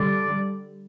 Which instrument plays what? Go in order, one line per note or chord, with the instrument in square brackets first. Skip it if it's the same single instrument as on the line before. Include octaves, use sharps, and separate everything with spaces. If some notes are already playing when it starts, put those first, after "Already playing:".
Already playing: [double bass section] D3 G3 [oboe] D5